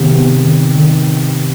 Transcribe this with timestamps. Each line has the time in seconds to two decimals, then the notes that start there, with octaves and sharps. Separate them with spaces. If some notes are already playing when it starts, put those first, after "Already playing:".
Already playing: C3 D#3 B3
0.12 B3
0.43 D#3
0.75 D#3